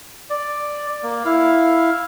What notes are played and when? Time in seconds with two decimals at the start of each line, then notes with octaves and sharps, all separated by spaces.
0.30 D5
1.03 A#3
1.25 E4 F5